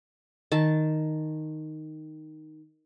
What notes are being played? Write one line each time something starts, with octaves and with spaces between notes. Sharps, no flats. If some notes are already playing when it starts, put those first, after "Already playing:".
D#3 A5